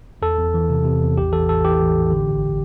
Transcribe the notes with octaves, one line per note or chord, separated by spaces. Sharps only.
E2 A4
E2
E3
C3
C3
E2
A1 G4
E3 A4
A1 A4
E3 G4
A1
A1
D3
G1